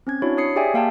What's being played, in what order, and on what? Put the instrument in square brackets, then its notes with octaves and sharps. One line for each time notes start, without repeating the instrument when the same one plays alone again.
[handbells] C4 C#4 G#6
D4 E4 F#4 C#5
C#5 D#6 C7 C#7
G4 G#4 D5 E5 G5 G#5
A#3 F5 G5 A5